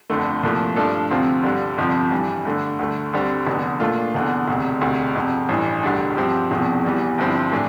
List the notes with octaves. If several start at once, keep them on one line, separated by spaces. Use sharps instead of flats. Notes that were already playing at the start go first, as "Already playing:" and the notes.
G1 F2 D3 A3
C2 A#2 F3 A3
G2 F3 A3 D4 A4
D2 C3 F3 C4 F4
G1 G2 D3 G3
G1 F2 C3 F3
G2 E3 G3
G2 D3 A3
D2 D3 A3
D2 D3 G3 C4
F1 E2 D3
A#2 A3 D4 F4
F1 E2 D3
E1 D2 C3
E1 D2 C3
G1 F2 C3
A1 G2 E3
E1 D2 D3 G3 D4
G2 F3 C4 G4
E1 E2 C3 F3
E2 E3 G3
G1 G2 F3 C4 E4
A2 E3 A3 D4